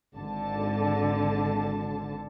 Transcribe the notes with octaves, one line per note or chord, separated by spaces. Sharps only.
G#1 D3 A5